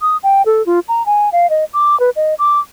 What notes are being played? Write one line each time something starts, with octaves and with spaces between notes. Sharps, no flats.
D#6
G5
A4
F4
A#5
G#5
F5
D#5
D6
B4
D#5
D6